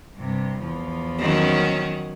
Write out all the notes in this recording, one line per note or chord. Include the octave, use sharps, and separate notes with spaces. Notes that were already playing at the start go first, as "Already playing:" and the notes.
G2 C3
E2 F3
D#3 F#3 C#4